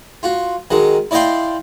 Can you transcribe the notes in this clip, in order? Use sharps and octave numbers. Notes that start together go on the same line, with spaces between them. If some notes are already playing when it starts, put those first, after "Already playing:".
F4 F#4
D#3 F#3 G#3
E4 D5 D#5 F5 G5 C6